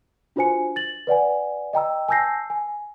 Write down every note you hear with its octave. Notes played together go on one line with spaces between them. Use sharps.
D4 F4 F#4 C5 G#5 C#7
A6 F#7
B4 D5 F#5 G#5
D#5 G5 A#5 E6
G#5 A5 E6 G6 A#6 C7
G#5